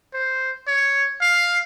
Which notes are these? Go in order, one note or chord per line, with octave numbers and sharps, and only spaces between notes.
C5
C#5
F5